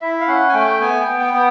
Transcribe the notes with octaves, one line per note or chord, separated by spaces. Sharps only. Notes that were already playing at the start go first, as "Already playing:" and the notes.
E4 E5
F5
C#4 F#5
G#5
A3 G5
B3 G#5
G5
B3
G5
B3